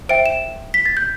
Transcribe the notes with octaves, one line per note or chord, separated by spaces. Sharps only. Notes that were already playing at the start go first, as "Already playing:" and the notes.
C5 E5 G5 D7
E7
B6
A6
G6